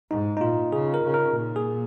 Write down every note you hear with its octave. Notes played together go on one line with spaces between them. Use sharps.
G#2 D#4
D#4
A#2 F4
C#3 G#4
A#4
C#3
A#4
A#2
G#4